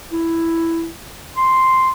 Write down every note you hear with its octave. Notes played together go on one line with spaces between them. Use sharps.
E4
C6